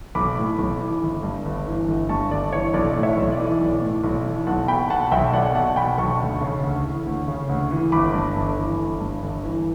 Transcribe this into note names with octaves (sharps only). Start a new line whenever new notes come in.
B1 B5 D6
A2
B1
E3
G1
G2
G1
E3
G1
G2 A5 C#6
G1 D5
E3 C#5
B1 D5
A2
C#5 E5
B1
D5
E3
B1
A2
B1
E3
B1 F#5 A5
B2 G5 B5
B2 F#5 A5
B1 E5 G5
B1 D5 F#5
B2 F#5 A5
B2 G5 B5
B1 A5 C#6
D2
C#3
D2
E3
D2
C#3
D2
E3
G1 B5 D6
G2
G1
E3
G1
G2
G1
E3